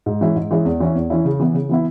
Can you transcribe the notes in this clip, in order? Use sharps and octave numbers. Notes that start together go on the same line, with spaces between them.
G#2
E3 G#3 C#4 E4
G#2
E3 G#3 C#4 E4
E2
E3 C#4 E4
E2
E3 C#4 E4
C#3
E3 B3 E4
C#3
E3 B3 E4